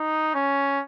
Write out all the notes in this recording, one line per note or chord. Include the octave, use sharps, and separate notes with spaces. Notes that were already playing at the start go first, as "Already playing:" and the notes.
Already playing: D#4
C#4